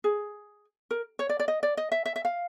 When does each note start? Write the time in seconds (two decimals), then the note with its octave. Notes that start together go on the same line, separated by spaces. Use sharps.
0.04 G#4
0.91 A#4
1.19 C#5
1.29 D5
1.40 D5
1.48 D#5
1.63 D5
1.77 D#5
1.92 E5
2.06 E5
2.16 E5
2.25 F5